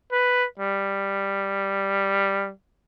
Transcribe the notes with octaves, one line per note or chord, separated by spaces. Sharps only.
B4
G3